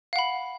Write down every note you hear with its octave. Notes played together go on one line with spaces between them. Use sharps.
F5 F#5 B5